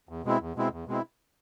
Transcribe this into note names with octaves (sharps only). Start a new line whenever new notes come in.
E2
B2 G#3 C4 E4
E2
B2 G#3 C4 E4
E2
B2 G#3 C4 E4